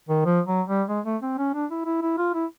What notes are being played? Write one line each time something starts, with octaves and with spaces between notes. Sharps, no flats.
D#3
F3
F#3
G3
G#3
A3
C4
C#4
D4
E4
E4
E4
F4
E4